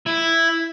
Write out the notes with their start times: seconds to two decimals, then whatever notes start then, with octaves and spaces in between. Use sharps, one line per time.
0.07 E4